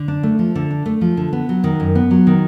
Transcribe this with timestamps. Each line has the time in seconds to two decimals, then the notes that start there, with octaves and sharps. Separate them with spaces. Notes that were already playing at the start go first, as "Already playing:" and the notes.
Already playing: D3
0.08 D4
0.23 A3
0.39 F3
0.55 D3
0.71 D4
0.86 A3
1.01 F3
1.17 D3
1.33 B3
1.49 F#3
1.64 D#3
1.80 F#2
1.95 B3
2.11 F#3
2.27 D#3